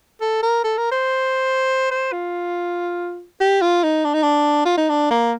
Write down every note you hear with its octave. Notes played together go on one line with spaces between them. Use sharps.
A4
A#4
A4
A#4
C5
C5
F4
G4
F4
D#4
D4
D#4
D4
F4
D#4
D4
A#3